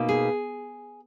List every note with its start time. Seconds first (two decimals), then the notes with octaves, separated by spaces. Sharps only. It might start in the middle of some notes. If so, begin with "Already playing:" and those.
Already playing: B2 A#3 D#4
0.09 G#4